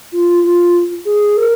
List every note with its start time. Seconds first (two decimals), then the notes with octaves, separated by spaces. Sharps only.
0.12 F4
0.43 F4
1.05 G#4
1.37 A#4